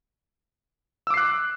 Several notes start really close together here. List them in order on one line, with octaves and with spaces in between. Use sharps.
E6 D6 C7 F#6